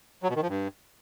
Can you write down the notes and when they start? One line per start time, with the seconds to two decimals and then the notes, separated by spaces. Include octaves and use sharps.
0.23 F#3
0.29 B2
0.36 D#3
0.42 F3
0.49 G2